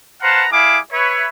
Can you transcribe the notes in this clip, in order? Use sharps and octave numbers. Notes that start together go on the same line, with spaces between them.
B4 C5 F5 F#5 A5 A#5
G3 E4 G#4 F5 G#5 D6
B4 C#5 E5